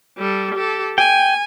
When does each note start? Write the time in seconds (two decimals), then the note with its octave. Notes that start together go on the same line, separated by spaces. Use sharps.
0.18 G3 A4
0.55 G4 A4
0.98 G5 G#5